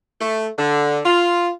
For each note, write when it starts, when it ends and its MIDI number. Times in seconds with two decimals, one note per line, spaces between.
0.21 0.48 57
0.59 0.99 50
1.05 1.50 65